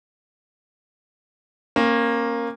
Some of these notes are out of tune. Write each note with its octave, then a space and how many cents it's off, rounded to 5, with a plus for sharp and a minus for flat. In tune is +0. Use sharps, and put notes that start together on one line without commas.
A#3 +0 C#4 -35